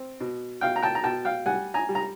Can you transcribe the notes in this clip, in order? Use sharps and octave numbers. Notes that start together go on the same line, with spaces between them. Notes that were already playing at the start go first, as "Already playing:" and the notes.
Already playing: C4
B2
B2 F5 G5
A#5
G5 A5
A#5
B2 G5 A5
F5 G5
G3 F#5 G#5
G#5 A#5
G3
A#5